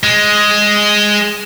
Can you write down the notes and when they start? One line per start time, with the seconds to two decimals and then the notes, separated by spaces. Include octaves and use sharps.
0.04 G#3